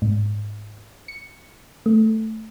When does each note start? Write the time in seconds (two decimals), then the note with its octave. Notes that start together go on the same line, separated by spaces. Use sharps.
0.02 G#2
1.08 C#7
1.86 A3